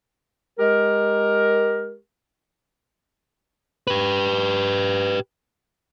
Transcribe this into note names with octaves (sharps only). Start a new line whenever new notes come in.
G#3 G4 A#4
G4 B4